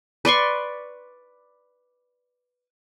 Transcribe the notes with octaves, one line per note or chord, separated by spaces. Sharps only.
B4 D5 C6 C#6